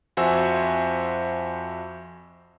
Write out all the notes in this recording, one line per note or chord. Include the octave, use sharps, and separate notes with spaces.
F2 F#4 C5 E5 G#5 E6